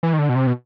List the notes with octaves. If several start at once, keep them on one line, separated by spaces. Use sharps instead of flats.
E3
D#3
D3
B2
C3
B2